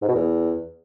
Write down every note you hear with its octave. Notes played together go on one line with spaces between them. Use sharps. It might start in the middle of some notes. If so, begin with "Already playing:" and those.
G#2
B2
E2